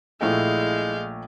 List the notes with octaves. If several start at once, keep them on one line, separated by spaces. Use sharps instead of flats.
A#1 G#3 A3 E4 F5 G#5 G6